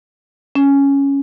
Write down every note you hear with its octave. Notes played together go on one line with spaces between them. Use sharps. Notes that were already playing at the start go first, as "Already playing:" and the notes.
C#4